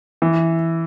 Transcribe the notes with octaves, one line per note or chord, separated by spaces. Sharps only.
E3